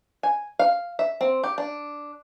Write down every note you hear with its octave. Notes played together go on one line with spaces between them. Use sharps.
G#5
F5
E5
C4
G4
D4